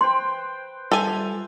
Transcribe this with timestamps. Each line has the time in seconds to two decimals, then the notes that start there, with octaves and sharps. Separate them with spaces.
0.01 B4 C5 G5 C6
0.92 G3 F4 A4 E5 G#5